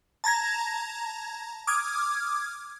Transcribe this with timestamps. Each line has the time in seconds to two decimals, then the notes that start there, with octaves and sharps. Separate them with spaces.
0.24 A5 A#5 G#6 A#6
1.67 D6 D#6 F6 G#6